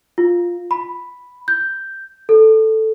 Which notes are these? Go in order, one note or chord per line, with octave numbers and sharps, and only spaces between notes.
F4
B5
G6
A4